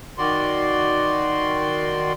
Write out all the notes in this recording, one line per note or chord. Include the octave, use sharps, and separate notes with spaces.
D#3 F#4 D5 C6